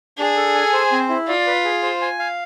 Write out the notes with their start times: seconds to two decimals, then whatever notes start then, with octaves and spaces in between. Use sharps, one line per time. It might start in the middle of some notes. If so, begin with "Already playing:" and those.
0.18 D4 G#4
0.37 A4
0.55 G#5
0.73 C5
0.92 C4
1.09 E4
1.28 F4 D5
1.47 B4
1.64 G#4
1.83 C5
2.01 G#5
2.19 F5